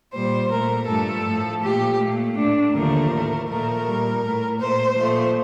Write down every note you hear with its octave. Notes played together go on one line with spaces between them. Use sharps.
A#2 G3 C5
A#2 A3 A#4
G2 F3 A3 A4
A2 F3 A3
A#2 F3 A3 G4
A#2 A3 A#3
A2 A3 D4
D#2 D3 F3 A3 A#4
A2 A3
A#2 F3 A3 A#4
A#2 G3
A2 A3
A#2 A3 C5
A#2 F3 A3